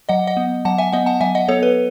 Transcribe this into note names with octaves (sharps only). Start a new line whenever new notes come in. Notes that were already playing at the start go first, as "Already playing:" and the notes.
F#3 D#5 F#5
D#5 F#5
B3
F#3 F#5 A5
E5 G#5
B3 D#5 F#5
F#5 A5
F#3 E5 G#5
D#5 F#5
B3 A4 C#5
B4